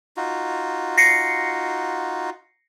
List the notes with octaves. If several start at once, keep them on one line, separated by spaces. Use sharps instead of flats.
D#4 F4 F#4
A#6 C7 C#7